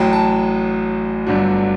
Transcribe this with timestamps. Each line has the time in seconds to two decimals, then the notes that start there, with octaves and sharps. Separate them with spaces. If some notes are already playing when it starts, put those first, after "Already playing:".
Already playing: A1 A2 F#3 G5
0.13 A5
1.27 G1 G2 D3 F#3